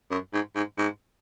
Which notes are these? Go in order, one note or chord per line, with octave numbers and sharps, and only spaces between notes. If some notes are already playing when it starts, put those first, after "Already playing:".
F#2
G#2
G#2
G#2